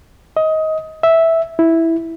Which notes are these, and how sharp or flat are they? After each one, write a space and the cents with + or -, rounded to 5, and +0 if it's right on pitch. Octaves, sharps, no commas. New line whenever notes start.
D#5 +20
E5 -5
E4 -5